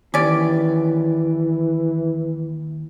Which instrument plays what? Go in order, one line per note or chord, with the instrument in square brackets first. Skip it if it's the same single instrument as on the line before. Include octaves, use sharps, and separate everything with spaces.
[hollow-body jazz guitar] D#2 [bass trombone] E3 [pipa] C#4 D5